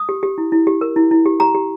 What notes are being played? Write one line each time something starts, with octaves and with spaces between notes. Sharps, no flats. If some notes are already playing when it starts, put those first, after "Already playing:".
Already playing: D#6
G4
G4
E4
E4
G4
A#4
E4
E4
G4
G4 A#5
G4